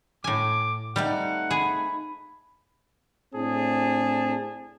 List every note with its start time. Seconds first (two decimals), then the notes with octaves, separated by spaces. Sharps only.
0.24 A2 G#5 D6
0.96 F2 G3 A3 D#4 F#5
1.51 G#4 B5
3.34 A2 C4 D4 G#4 A5